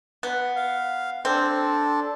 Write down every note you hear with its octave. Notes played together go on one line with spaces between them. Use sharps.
B3
F5
C4 D4 A4